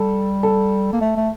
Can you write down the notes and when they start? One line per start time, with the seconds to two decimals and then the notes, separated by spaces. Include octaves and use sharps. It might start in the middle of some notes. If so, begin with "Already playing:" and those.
Already playing: G3 A4
0.43 A4
0.93 A#3
1.01 A3
1.17 A3